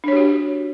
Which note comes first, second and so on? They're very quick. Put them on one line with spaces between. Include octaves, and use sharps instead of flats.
D4 C#5 G4 F#4